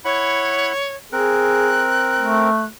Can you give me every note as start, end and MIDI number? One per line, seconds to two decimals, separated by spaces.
0.05 0.73 64
0.05 0.95 73
0.05 0.73 78
0.05 0.73 83
1.12 2.50 60
1.12 1.86 68
1.12 2.50 70
1.12 2.66 90
2.20 2.68 57